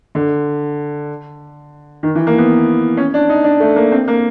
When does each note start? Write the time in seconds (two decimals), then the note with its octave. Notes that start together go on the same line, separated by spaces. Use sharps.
0.15 D3
2.03 D#3
2.15 E3
2.27 A#3
2.38 B3
2.97 C#4
3.14 D4
3.29 D#4
3.44 D4
3.60 A3
3.76 A#3
3.92 C4
4.08 A#3